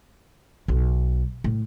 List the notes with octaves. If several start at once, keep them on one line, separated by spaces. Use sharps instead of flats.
B1
A2